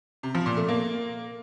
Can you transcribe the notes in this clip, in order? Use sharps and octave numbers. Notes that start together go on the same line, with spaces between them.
C3
F3
A#2
A3
A#3